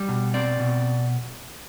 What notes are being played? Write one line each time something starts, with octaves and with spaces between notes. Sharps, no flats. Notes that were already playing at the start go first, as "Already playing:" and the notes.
Already playing: G3
B2
C4 D5
B2